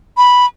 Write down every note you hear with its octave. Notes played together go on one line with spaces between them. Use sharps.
B5